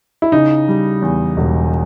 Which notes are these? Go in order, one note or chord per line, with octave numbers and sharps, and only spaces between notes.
E4
C#3 D#4
G3
E2
E1